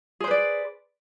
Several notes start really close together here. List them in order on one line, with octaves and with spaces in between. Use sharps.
G#4 C5 B4 D5